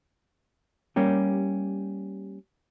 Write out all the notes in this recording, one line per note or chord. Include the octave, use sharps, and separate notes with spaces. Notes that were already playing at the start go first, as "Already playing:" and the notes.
G3 A#3 C#4 G4